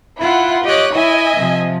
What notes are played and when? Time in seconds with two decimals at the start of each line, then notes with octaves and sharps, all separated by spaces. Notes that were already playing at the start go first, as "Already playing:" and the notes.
0.21 E4 F4 F#5
0.64 G4 C#5 D#5 D6 F#6
0.93 E4 D#5 E5 G#5
1.37 C3 F3